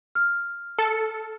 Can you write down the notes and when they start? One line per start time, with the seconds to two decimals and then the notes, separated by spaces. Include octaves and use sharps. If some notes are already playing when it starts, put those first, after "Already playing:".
0.15 F6
0.78 A4 C#7